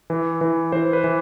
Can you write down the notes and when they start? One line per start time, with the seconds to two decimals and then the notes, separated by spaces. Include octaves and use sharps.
0.10 E3
0.41 E3
0.72 E3 C5
0.93 B4
1.04 E3